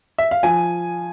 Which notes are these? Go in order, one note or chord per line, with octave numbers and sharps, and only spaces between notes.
E5
F5
F3 G#5